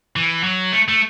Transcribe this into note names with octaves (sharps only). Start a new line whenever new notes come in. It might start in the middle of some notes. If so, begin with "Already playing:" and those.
E3
F#3
A3
A3